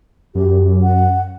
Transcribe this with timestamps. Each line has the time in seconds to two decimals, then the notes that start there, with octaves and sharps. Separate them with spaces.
0.35 F#2 G4
0.83 F#5